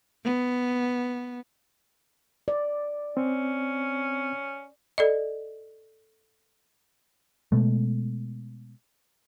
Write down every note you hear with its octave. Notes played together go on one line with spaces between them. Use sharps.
B3
D5
C4 C#4
A4 D5 D#5
B2 G#3 A3